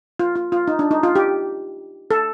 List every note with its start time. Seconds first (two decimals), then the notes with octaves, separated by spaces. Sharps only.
0.20 F4
0.35 F4
0.52 F4
0.68 D#4
0.79 D4
0.91 D#4
1.03 F4
1.16 G4
2.11 A4